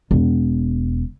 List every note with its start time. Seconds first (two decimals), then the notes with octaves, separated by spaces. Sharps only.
0.11 E1